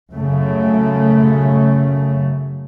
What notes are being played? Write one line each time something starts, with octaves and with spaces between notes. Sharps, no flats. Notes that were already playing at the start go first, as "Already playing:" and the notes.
F#2 C#3 A3